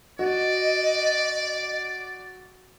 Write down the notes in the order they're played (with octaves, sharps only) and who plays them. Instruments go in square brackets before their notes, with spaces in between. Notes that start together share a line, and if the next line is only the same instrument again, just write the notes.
[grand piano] F#4 [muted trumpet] D5 [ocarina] D#5